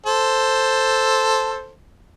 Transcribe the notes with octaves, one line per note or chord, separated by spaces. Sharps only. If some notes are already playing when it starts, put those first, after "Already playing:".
A4 C5